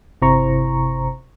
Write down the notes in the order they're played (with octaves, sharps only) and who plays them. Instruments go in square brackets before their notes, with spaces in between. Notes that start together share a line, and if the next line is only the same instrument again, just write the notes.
[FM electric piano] G1 C3 E4 C5 A#5 C#6